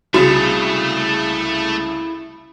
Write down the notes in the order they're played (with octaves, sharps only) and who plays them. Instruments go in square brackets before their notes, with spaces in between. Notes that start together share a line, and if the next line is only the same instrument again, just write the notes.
[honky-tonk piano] C2 C#3 [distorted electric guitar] A3 [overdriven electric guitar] E4 [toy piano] F#4